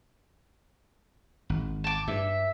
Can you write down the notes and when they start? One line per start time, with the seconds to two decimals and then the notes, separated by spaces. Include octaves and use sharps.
1.50 G#1
1.84 A5 D6
2.08 G2 E5